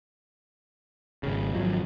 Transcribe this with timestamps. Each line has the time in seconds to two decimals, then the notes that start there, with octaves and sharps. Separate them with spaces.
1.23 G#1 C#3
1.54 G#1 F2 F3 F#3